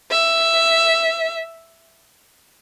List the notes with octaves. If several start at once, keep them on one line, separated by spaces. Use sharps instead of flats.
E5